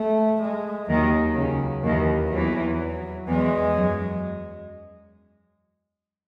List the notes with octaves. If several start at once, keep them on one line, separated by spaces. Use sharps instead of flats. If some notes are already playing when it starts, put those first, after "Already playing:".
Already playing: A3
G#3
D#2 D#3 F#3
C#2 C#3
D#2 D#3 E3
E2 E3 F#3
E2 E3 G#3
F#2 F#3